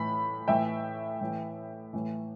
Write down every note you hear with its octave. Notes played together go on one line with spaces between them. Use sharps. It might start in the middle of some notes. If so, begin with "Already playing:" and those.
Already playing: A2 E3 B5
A2 E3 E5 G5
A2 E3
A2 E3